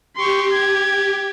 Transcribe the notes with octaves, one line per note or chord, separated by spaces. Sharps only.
G4 C6 C#6
G#6